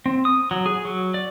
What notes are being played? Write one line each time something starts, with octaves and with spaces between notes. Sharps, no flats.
C4
D#6
F#3
G#4
F#3
D5